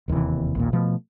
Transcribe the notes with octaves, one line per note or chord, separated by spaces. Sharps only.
E1 D#2 C3 E3
A#1 D#2 A#2
B2 F3 A3